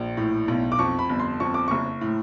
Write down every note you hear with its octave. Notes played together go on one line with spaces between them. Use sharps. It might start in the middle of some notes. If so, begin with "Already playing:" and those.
Already playing: A#1 A#2
A2
B1
D6
F2 C#6
B5
G1
C6
F2 C#6
D6
F#1 C#6
A2